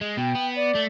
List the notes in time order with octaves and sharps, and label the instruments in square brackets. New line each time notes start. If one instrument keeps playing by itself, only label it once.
[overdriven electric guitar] G#3
[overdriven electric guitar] B2 [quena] G5
[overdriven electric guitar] B3
[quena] D5
[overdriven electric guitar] A3